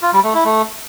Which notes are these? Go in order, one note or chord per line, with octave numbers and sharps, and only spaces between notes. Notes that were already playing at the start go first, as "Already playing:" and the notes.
F4
G3
A3
E4
A3